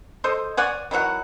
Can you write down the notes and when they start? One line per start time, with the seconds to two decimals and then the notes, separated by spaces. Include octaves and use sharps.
0.24 A4 C5 D#5
0.57 C#5 D5 F#5 G#5
0.91 D#3 E3 F#3 F#5